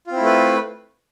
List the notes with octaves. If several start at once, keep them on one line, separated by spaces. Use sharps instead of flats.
A3 C4 E4 F4 B4